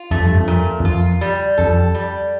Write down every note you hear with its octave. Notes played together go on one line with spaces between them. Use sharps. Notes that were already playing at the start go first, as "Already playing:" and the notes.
Already playing: F4
F2 A3
G2
F2
A#2
E2
F2 F4
G3
F2 A4
G3